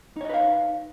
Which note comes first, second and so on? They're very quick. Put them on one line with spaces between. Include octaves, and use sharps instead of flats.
D#4 C#5 D#5 B4 F5